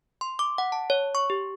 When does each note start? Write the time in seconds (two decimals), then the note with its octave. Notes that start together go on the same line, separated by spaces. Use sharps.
0.21 C6
0.39 D6
0.58 F#5
0.72 A5
0.90 C#5
1.15 C#6
1.30 G4